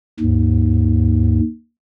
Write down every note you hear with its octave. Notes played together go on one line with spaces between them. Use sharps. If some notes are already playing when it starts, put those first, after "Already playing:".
D#2 G#2